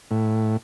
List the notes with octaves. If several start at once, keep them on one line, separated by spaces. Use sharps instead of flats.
A2